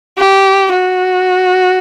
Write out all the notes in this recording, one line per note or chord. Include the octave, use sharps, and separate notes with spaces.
G4
F#4